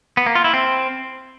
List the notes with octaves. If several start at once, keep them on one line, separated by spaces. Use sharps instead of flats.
B3
A#3
F4
E4
C4